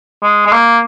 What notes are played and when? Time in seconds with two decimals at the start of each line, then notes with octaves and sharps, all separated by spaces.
0.23 G#3
0.47 G#3
0.52 A#3